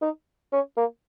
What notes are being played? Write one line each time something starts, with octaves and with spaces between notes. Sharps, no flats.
D#4
C#4
A#3